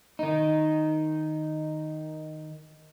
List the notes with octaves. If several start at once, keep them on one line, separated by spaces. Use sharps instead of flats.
D#3 D#4